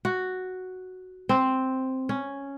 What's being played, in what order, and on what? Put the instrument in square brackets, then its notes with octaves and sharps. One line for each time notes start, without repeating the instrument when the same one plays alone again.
[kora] F#4
C4
C#4